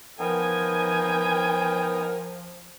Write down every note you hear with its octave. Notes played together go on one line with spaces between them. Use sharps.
F3 B3 D#4 A#4 G5 G#5